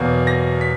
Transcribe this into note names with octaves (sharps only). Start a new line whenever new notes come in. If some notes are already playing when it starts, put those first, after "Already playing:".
Already playing: E2 B2 F#3 A#3
A#6
B6